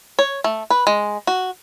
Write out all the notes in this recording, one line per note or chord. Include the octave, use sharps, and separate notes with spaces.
C#5
A3
B4
G#3
F#4